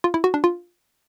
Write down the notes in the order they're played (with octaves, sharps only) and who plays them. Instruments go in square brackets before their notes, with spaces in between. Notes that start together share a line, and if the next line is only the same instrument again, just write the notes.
[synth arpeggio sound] F4
E4
F#4
D4
F4